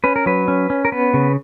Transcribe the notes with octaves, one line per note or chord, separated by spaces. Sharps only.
C#4 B4
A#4
F#3 B4
C#4
C#4
A#4
B3 B4
C#3